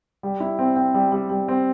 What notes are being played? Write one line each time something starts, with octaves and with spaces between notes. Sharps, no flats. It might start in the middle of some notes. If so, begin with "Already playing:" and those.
G3
E4
C4
C4
G3
G3
G3
C4